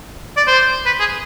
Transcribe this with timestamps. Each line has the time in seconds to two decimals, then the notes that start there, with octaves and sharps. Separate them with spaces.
0.37 D5
0.47 C5
0.86 B4
0.99 G#4